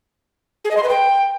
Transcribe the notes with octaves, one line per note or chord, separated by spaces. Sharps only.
G#4
D#5
C6
B4
G5